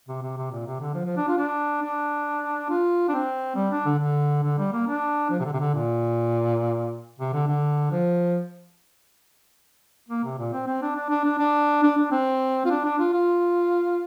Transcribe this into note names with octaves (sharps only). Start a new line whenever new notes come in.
C3
C3
C3
A#2
C3
D3
F3
F3
D4
F4
D4
D4
F4
D4
C4
G3
D4
D3
D3
D3
G3
A#3
D4
F3
C3
D3
C3
D3
A#2
C3
D3
D3
F3
A#3
C3
A#2
C4
C4
D4
D4
D4
D4
D4
D4
D4
C4
F4
D4
D4
F4
F4